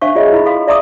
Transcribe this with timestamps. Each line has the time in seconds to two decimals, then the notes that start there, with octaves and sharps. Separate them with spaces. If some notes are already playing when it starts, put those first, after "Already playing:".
0.01 D4 C5 E5 F5 C#6
0.15 F4 G#4 C#5 D#5 E5
0.33 E4 F4 B5
0.46 A4 F5 C6
0.67 D5 E5 A#5 C6 D6 D#6